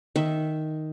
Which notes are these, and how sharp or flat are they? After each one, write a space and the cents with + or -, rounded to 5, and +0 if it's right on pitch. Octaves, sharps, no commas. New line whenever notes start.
D#3 +0 E5 +0